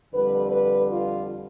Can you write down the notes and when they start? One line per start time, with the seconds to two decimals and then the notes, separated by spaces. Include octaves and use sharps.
0.14 F2 D3 G3 B4
0.51 B4
0.90 F4